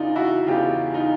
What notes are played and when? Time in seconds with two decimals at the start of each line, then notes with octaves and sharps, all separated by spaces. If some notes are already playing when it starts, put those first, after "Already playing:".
Already playing: E2 C#3 E3 D4 D#4 F4
0.16 E4 F#4
0.47 E2 C#3 E3 F4 G4
0.94 D#4 F4